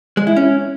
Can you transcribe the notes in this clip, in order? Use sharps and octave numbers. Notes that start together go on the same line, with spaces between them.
G#3
E4
C#4